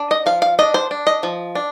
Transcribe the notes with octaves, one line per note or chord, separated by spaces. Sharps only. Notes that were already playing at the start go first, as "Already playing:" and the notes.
Already playing: D4
D#5
F3 F5
F5
D4 D#5
C5
D4
D#5
F3
D4